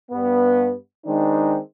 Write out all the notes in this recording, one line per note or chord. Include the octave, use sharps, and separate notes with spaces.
G2 B3
D#3 G#3 C4 D4 D#4